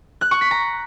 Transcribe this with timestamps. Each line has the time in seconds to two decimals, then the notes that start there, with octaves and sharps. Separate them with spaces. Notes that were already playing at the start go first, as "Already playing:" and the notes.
0.21 F#6
0.31 C#6
0.41 B6
0.51 A#5